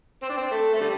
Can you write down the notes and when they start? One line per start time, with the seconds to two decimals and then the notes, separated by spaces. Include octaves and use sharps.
0.23 C4
0.30 D4
0.37 C4
0.51 A3
0.74 A3
0.80 D3 G3